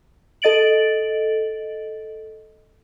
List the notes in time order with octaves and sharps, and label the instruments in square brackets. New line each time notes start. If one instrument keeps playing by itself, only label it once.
[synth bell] A4 D#5 A6 D7 F#7